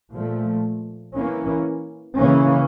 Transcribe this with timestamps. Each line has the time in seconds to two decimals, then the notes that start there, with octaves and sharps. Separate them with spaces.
0.12 A#2 F3 A3
1.15 E3 A#3 C#4
2.17 C#3 E3 A#3 C#4